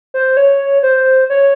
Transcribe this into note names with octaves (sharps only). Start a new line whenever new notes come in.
C5
C#5
C5
C#5